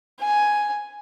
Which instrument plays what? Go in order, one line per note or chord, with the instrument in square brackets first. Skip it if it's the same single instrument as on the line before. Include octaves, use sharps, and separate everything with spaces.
[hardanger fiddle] G#5